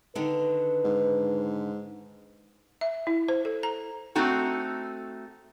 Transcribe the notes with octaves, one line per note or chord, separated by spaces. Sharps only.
D3 D#3 B4
G#2
E5
E4
C5
A4
A#5
A3 C4 D#4 F#4